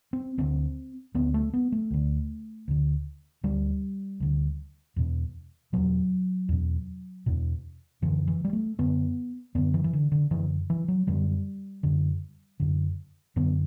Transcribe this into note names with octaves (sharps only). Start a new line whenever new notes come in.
C4
D2 D3 C4
D2 D3 B3
A3
B3
A3
D2 D3
D2 D3
D2 D3 G3
D2 D3
E2 B2
E2 B2 F#3
E2 B2
E2 B2
F#2 D3 E3
E3
G3
A3
F#2 D3 B3
F#2 D3 B3
E3
E3
D3
D3
F#2 D3 E3
E3
F#3
F#2 D3 G3
F#2 D3
F#2 D3
F#2 D3 B3